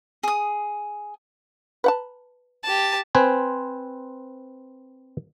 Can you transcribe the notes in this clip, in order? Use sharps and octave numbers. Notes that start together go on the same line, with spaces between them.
G#4 D#6
B4 F#5 A5
G4 A5
C4 B4 C5 G#5